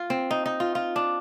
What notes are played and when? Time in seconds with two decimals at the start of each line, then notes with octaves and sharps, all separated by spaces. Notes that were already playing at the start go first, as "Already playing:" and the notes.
Already playing: F4
0.10 C4
0.31 D#4
0.46 D#4
0.60 F4
0.75 F4
0.96 D4